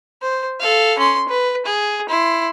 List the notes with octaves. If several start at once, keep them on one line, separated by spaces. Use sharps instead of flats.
C5
A4 F5
C#4 C6
B4
G#4
E4 C6